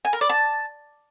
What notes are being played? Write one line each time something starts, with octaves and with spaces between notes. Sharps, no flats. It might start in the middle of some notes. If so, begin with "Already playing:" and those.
G#5
A#4
D5
A5